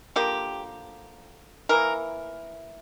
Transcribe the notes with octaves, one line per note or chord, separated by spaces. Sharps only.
D3 F3 A#3 G4
E3 A#3 A#4